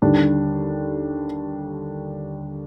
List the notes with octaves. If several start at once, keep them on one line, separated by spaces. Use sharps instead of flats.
D#2 D3 G3 D4